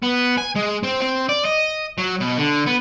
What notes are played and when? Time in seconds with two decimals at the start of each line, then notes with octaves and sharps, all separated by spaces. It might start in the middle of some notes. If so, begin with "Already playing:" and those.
0.02 B3
0.38 G#5
0.56 G#3
0.83 C4
1.02 C4
1.29 D5
1.45 D#5
1.98 F#3
2.20 B2
2.37 D3
2.66 B3